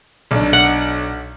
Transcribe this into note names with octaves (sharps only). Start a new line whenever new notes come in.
B1 D4
F#5